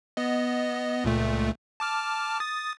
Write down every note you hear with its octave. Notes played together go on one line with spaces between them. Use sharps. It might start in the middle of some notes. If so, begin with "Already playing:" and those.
B3 D#5
C#2 A#2 A3
A5 D6 F6
D#6 A6